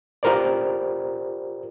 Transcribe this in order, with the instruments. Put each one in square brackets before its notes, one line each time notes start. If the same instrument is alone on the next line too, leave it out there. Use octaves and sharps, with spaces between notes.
[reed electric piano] F4 G4 A#4 C5 D5